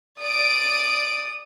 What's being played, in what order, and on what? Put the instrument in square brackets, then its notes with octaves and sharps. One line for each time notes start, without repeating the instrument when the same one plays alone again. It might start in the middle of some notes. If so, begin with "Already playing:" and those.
[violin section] D5 D7 [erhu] D#6